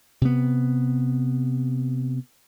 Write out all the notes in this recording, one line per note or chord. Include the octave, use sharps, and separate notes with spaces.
C3 B3